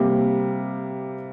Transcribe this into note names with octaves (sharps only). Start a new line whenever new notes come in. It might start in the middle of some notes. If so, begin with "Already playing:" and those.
Already playing: C3 G3 A#3